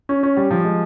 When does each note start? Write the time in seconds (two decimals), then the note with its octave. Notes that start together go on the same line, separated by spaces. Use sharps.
0.09 C#4
0.23 C#4
0.37 G3
0.51 F3
0.65 G#3